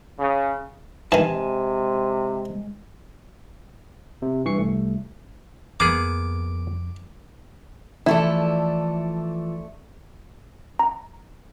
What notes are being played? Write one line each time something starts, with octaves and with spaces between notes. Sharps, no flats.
C#3
C3 D#3 E3 G#3 G#5 A5
C3
G2 E3 C#6 C7 C#7
C2 A3
F2 A#3 B3 G#4 D6
E3 F3 A3 E4 A4 D5
A#5